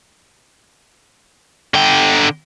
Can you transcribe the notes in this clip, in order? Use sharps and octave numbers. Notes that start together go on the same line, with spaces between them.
D3 G5